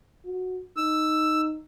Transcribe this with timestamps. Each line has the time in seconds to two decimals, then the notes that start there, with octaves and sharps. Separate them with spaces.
0.25 F#4
0.77 D#4 E6